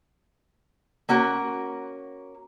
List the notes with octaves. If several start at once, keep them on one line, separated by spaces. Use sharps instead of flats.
A#3 C#4 F#4 A#4